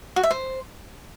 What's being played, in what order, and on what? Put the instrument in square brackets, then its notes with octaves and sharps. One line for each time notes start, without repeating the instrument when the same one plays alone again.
[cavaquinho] F#4
E5
C5